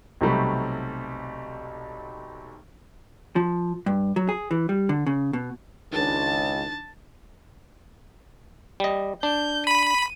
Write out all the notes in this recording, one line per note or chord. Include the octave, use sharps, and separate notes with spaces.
B1 C3 F#3 G3 A3
F3
G2
F#3
G#4
E3
G3
D3
C#3
B2
C#2 D#3 D4 A5
G3 D#5
D4 G6
B5 D#7